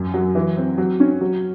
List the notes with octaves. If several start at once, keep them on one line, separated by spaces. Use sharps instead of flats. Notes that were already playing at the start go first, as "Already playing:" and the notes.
Already playing: F#2
F#3
E3
C4
F#3
C#4
F#3